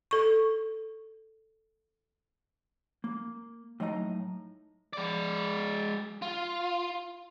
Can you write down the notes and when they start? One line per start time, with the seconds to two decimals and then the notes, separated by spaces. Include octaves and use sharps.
0.11 A4 C#6
3.04 A#3
3.80 A2 F#3 D#4 D#5 F#5 A#5
4.93 G#3 D5
6.22 F4